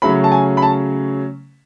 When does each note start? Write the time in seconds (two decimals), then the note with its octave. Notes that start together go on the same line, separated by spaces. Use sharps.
0.02 C#3 F#3 A3 C#4 B5
0.24 A5
0.32 G#5
0.57 B5
0.62 A5